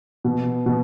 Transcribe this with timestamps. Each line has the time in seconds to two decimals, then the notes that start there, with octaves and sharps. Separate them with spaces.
0.24 B2
0.66 B2